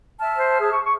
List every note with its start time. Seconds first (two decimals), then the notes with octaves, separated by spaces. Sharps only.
0.19 E5 A5 F6
0.36 C5
0.60 G#4
0.72 C#6
0.85 C#6